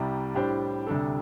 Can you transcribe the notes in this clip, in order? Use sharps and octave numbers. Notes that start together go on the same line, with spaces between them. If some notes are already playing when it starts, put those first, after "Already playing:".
Already playing: C2 C3 G3
A2 G3 D4 G4 C5
D2 C3 G3 D4 A4